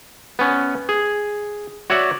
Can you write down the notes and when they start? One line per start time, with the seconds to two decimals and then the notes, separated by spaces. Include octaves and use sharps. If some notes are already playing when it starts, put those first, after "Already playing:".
0.39 B3 C#4
0.89 G#4
1.90 F#4 C#5 D5 E5 F#5